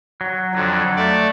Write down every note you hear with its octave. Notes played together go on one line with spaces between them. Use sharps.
F#3
F2 D3 F#3
A3 D5